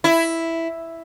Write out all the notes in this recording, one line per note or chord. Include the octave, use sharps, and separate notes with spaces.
E4